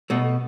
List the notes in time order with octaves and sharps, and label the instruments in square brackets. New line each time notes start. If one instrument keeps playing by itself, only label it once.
[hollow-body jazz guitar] B2 A3